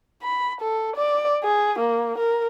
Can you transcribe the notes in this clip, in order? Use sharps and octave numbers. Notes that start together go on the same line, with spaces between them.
B5
A4
D5
G#4
A#3
A#4